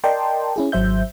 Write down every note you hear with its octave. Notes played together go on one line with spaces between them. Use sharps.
A#4 D5 D#5 G5 A5 C6
C#4 E4 G#4
G#1 F#3 C5 E5 G6